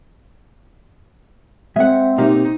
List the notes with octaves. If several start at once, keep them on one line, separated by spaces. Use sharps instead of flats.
G#3 C4 E5 F#5
B2 A#3 D#4 G4